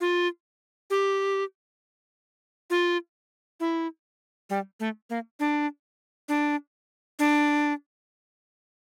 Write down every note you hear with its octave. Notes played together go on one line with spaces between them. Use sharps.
F4
G4
F4
E4
G3
A3
A#3
D4
D4
D4